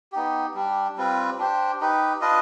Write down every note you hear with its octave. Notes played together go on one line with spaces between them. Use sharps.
B3 D#4 G4
G3 D4 G4
G3 C4 F4 B4
D4 G4 C5
D#4 G4 B4
D4 F4 B4 D#5